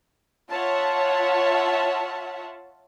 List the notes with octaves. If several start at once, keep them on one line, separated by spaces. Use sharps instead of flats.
F4 C#5 E5 F#5 A5